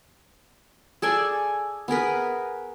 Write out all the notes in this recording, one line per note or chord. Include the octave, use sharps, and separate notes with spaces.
G#4 A4 D5 G#5
B3 G#4 A#4 B4